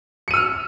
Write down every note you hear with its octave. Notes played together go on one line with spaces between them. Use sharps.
E6 F6 C#7 D#7